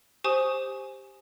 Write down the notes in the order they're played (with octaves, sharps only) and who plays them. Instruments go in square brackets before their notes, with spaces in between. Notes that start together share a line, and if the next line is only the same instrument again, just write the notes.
[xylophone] G4 C5 G#5 C#6 D#6